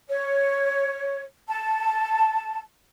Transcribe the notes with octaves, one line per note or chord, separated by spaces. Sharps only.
C#5
A5